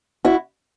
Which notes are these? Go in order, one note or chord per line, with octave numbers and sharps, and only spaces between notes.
E4 F#4